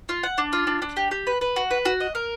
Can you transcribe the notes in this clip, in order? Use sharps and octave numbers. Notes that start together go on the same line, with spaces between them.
F4
F#5
D4
F4
D4
D4
G4
G4
B4
B4
F#4
B4
F#4
D#5
A#4